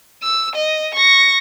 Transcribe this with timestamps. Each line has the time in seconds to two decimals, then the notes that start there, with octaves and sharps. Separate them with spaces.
0.23 E6
0.55 D#5
0.94 C#6 A#6